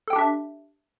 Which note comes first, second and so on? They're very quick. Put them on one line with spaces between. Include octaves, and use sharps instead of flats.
A4 G5 G4 D4 E5